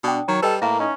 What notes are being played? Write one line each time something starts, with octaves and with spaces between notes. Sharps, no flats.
B2 D4 G5 D#6
D#3 F#3 C#5 A#5
G3 A4 B4 D#5 G5 E6
A2 A#3 A#4 E5 F5 A#5
C#4 D#4